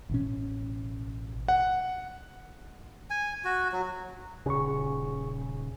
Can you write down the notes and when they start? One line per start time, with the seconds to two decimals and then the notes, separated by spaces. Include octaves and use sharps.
0.09 A1 B2 C#4
1.48 F#5
3.10 G#5
3.45 F#4
3.72 F#3
4.46 D#1 C#3 G#4 C#6